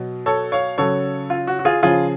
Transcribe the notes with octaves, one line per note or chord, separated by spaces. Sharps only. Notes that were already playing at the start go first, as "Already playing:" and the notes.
Already playing: B2 F#3
A4 C#5
C#5 F5
C#3 F#3 A4 C#5
F4
F#4
F#4
F4 G#4
C#3 F3 F4 G#4